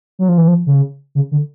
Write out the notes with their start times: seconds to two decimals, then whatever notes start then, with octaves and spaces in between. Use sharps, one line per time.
0.19 F#3
0.29 F3
0.38 E3
0.48 F3
0.67 C#3
1.15 C#3
1.32 D3